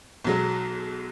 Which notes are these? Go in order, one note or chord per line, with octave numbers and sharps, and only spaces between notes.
B1 F#3 G#3